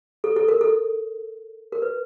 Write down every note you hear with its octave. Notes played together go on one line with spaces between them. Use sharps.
A4
A4
A#4
A4
A#4
B4